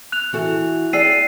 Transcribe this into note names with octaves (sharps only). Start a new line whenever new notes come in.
F#6 F7
E3 F#4 A4
G#4 D5 G5 E6 C7 D#7